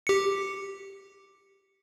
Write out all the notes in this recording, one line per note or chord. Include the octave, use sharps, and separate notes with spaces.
G4 C#7